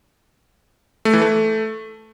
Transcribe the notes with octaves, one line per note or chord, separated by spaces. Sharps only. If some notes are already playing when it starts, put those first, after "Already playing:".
A3
E3
A3